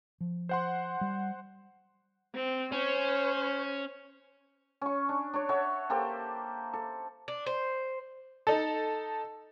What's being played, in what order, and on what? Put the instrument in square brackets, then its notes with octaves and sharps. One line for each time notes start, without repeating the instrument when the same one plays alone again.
[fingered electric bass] F3
[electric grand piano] C5 F#5 C6
[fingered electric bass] G3
[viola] C4
[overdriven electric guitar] C#4 [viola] C5 C#5
[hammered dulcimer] C#4 C#6
D4
D4 C#5
F#4 A4 C#5 E5
A#3 G4 A4 C5
A4
[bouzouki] D4
C5
[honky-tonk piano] D#4 A4